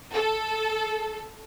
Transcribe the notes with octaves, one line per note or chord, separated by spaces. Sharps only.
A4